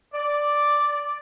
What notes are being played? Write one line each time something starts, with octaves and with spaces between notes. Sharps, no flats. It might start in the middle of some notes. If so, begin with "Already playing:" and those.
D5